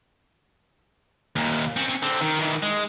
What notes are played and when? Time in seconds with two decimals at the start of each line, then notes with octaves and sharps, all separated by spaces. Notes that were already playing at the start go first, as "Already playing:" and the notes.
1.36 D#2 A#2
1.76 C4 C#4
2.03 D3 C4
2.21 D#3
2.39 D#3 E3
2.62 G#3